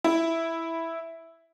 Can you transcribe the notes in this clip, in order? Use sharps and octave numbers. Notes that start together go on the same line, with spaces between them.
E4